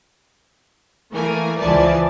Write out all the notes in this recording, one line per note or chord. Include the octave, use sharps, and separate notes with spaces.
E3 A3 A#3 A#4 G#5
C#2 E3 F3 D5 G#5 A5